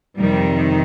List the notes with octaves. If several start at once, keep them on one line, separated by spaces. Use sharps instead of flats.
F2 C3 D#3 G3